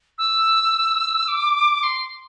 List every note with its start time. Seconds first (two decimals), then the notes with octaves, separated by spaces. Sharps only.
0.18 E6
1.28 D6
1.83 C6